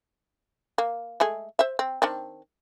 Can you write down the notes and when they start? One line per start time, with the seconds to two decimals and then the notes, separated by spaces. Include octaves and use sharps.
0.78 A#3
1.20 G#3 A3 G#4
1.59 C5 E5
1.79 C4
2.02 D#3 C4 D4